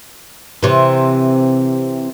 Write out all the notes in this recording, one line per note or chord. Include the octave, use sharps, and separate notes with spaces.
C3 E3